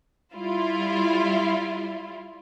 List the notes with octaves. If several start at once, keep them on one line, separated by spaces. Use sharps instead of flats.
G3 E4 F4